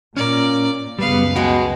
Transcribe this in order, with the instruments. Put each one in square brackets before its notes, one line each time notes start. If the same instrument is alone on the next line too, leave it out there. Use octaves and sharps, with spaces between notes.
[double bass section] A#2 [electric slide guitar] C#4 A#4 [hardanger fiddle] D5
[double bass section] C#2 F#2 [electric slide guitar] G3 B3 [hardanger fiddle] B4 F5
[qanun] B2 B3 G5 [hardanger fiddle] G#3 [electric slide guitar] F#4